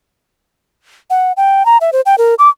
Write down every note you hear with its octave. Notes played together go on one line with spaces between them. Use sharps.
F#5
G5
A#5
E5
C5
G5
A#4
D6